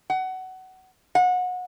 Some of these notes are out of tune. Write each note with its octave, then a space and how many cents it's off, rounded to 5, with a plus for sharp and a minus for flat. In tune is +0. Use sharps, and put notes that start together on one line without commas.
F#5 +20
F#5 -25